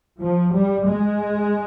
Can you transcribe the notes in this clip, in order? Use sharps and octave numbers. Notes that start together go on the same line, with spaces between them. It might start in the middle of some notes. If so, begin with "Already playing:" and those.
F3
G3
G#3